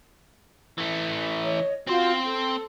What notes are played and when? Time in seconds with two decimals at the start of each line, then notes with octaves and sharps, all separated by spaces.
0.78 E3 A3
1.44 C#5 D#5
1.87 C4 F4 F#4 C5
2.25 A4